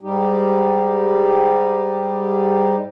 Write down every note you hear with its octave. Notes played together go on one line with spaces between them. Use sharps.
G#2 G3 D#4 G4